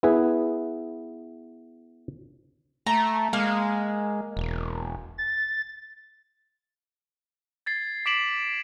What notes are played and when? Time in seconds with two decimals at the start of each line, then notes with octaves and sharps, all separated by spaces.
0.03 B3 E4 G#4 B4
2.86 A3 A#5
3.33 G#3 A#3 F5
4.37 E1
5.18 A6
7.66 G#6 A6 C7
8.06 D6 B6 D7 E7 F#7